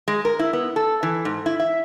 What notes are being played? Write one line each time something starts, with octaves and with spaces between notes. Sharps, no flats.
G#3
A#4
E4
B3
A4
E3
G#2
E4
E5